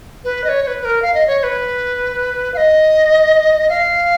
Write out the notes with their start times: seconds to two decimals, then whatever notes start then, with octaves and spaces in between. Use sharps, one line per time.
0.24 B4
0.44 D#5
0.48 C#5
0.63 C#5
0.67 B4
0.81 B4
0.85 A#4
1.02 F5
1.14 D#5
1.27 C#5
1.40 C#5
1.43 B4
2.54 F5
2.57 D#5
3.69 F5